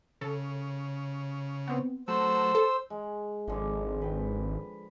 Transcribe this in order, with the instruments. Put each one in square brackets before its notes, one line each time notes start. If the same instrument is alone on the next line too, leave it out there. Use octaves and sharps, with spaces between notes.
[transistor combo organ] C#3 [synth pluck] A4
[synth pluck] B3 C4
[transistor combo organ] F#3 A3 [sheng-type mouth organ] C5 E6
[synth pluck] A4
[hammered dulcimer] G#3
[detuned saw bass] G#1 [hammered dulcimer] D3 F3 G#3
[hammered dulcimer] B4 G5